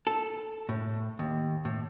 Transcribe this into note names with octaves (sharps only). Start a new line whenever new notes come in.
A4
A2
D#2
A2